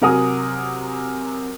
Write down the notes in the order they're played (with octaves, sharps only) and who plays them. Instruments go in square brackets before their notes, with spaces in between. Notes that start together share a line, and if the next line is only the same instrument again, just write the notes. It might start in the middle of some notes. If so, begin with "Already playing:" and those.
[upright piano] C3 F#3 A#4 F#5 G#5 D#6